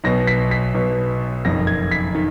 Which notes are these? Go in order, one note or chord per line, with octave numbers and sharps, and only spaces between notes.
B1 B2 A#6
B6
B6
B1 B2
F#1 F2 D#3 A#6
G#6
B6
D#3